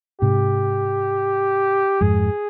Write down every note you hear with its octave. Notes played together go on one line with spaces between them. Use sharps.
G#2 C3 G4
F2 G#2 G#4